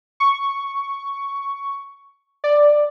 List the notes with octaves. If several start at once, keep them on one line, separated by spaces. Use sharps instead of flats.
C#6
D5